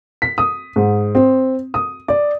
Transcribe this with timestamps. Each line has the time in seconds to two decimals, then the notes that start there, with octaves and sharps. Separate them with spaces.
0.22 B6
0.38 D#6
0.76 G#2
1.15 C4
1.74 D#6
2.08 D5